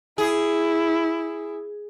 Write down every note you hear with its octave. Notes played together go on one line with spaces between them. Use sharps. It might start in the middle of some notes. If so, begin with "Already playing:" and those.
E4 G#4